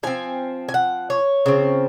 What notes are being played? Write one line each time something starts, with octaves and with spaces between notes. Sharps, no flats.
F3 C4 G#5
G#5
F#5
C#5
C#3 F3 C4